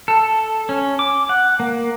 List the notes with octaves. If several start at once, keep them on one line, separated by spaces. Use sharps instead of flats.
A4
C#4
D6
F#5
A#3